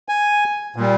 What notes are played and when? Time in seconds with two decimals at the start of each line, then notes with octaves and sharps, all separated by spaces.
0.09 G#5
0.76 A#2 G3